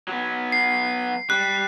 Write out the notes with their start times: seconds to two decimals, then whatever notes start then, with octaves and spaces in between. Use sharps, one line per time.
0.08 F#3 B3
0.52 C7
1.30 G3 F#6